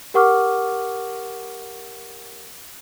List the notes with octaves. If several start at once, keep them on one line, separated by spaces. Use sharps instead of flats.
G4 A#4 F#5 C#6 D6 F6